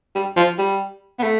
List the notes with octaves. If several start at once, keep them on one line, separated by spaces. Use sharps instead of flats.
G3
F3
G3
B3
A3